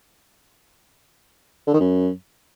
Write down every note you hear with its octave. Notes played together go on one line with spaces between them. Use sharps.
D3
D#3
F#2